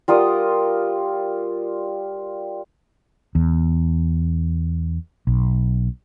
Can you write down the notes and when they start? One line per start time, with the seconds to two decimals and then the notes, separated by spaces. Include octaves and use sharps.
0.08 G3 F4 A#4 D#6
3.35 E2
5.27 B1